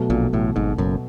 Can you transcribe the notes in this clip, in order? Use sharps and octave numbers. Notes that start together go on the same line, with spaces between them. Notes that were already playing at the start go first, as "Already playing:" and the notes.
Already playing: B2 F#3 A3
A#1 A#2
A1 A2
G#1 G#2
F#1 F#2